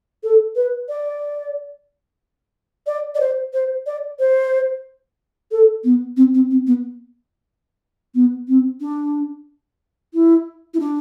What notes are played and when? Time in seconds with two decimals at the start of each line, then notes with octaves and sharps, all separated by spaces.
0.23 A4
0.56 B4
0.89 D5
2.87 D5
3.15 D5
3.20 C5
3.53 C5
3.86 D5
4.19 C5
5.51 A4
5.84 B3
6.16 C4
6.34 C4
6.50 C4
6.67 B3
8.14 B3
8.48 C4
8.80 D4
10.14 E4
10.74 E4
10.79 D4